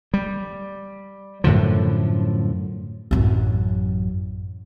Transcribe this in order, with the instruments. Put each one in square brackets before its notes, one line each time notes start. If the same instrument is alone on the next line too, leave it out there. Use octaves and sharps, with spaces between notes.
[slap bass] G3
F#2 A2 D3 F3
[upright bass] A1 F#2